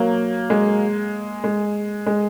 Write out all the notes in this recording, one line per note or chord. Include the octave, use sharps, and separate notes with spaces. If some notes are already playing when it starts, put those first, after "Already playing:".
Already playing: F#3 A#3
G#3
G#3
G#3